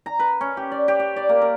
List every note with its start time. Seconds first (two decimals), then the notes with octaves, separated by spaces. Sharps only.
0.06 A#5
0.19 B4
0.41 C#4
0.57 G4
0.71 D5
0.88 G4
1.00 G4
1.16 D5
1.29 A#3
1.42 A#4